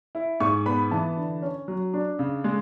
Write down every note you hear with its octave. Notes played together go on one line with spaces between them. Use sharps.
E4
G#2 C#6
B3 B5
E3 A5
D3
C#4
F#3
D4
C#3
G#3